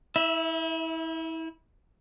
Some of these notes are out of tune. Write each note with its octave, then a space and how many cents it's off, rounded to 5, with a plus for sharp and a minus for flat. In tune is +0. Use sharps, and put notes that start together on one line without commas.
E4 -30 E5 +0